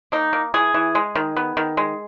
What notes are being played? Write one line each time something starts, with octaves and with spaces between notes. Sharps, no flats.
A#3 D#4
A#3
E3 G#4
E3
G#3
D#3
B3
D#3
G#3